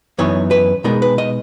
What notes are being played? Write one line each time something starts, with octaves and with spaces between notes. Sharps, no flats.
F#2 E3 B3 D#4 C#5
B4
B2 G#3 B3 D#4 A#4
B4
D#5